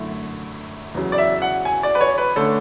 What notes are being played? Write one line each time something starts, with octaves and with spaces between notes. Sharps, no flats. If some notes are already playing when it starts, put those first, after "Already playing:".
Already playing: F#2 D3 A3 E4
E2 C#3 F#3
D5
E5
F#5
G#5
D5
B4
C#5
B4
D3 A3 C#4 A4